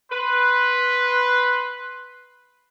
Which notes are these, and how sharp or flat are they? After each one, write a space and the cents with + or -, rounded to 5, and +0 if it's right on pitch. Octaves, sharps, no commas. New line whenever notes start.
B4 +0 C6 +0